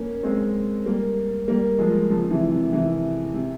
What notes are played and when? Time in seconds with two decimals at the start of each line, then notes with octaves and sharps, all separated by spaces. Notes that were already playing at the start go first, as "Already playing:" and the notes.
Already playing: A#3 C#4
0.23 G#3 C4
0.86 G3 A#3
1.48 G3 A#3
1.79 F3 G#3
2.10 C#3 F3
2.30 C3 E3
2.51 C3
2.73 C3 E3
3.34 C3